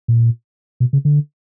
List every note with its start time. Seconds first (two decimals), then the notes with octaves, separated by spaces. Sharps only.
0.08 A#2
0.80 B2
0.93 C#3
1.05 D3